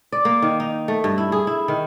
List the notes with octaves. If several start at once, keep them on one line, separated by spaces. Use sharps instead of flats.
D5
A#3
D#3
D#4
A3
G2
E4
G#4
E4
D#3